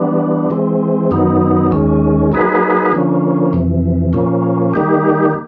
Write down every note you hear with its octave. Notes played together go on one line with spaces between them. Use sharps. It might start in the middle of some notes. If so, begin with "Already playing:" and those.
Already playing: E3 G3 B3 D4
E3 G#3 C4
F#2 D#3 F#3 B3 D#4
D#2 D#3 G#3 C#4
F#3 A#3 D#4 G#4 B4
D3 F3 A#3 C#4
F2 C3 E3
A#2 F3 A#3 C#4
D#3 G3 A#3 D#4 G4